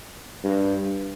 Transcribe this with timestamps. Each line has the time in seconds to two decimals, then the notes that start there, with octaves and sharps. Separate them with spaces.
0.44 G2